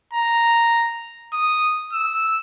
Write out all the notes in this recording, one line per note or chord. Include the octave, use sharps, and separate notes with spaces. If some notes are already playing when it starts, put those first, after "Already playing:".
A#5
D#6
E6